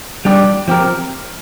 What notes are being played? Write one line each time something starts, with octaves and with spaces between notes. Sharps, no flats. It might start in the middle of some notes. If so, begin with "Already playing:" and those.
G3 D4 G4 D5
F3 C4 G4 A#4